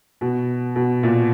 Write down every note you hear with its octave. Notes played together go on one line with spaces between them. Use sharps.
B2
B2
A#2